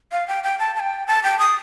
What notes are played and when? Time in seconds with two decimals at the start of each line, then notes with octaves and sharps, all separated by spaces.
0.12 F5
0.28 G5
0.44 G5
0.59 A5
0.75 A5
0.80 G5
1.08 A5
1.24 G5
1.39 D#6